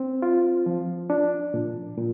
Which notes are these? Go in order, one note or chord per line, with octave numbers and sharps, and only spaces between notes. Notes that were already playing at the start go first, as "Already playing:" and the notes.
Already playing: C4
F4
F3
D4
A#2
A#2